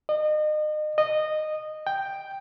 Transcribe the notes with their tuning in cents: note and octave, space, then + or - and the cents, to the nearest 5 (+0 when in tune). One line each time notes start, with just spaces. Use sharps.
D#5 -35
D#5 -15
G5 +5